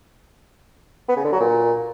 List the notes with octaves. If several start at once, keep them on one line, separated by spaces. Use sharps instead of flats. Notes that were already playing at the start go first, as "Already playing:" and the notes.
B3
C#3
D3
F#3
A#2